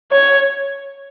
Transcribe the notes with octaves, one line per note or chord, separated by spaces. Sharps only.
C#5